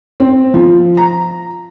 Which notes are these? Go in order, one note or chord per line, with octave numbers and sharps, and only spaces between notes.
C4
F3
A#5